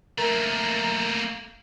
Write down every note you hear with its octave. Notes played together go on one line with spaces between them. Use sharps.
A3 A#3 A#4